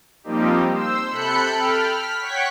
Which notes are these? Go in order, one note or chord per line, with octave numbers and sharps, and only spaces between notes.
F3 G3 A#3 C4 D#4 G4
C5 E6
C3 A4 B5 F#6 G6 C#7
A4 G5 B5 F6
F6 B6
C#5 F#5 G5 C#6 B6